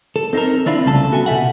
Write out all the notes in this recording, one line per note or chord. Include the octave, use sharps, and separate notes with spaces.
A4
C4 D#4 F4 A4 A#4
C4 D4 E4 F4
C2 C#3 A3 A4 A5
B3 F#4 A4 E5 G#5
B2 F4 G4 E5 F#5